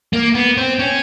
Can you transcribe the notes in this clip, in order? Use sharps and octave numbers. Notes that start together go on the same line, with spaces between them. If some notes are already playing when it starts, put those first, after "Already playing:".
A#3
B3
C4
C#4